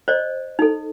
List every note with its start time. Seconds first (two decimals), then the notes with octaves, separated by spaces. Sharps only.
0.08 C5 D5 D#5
0.59 D#4 A4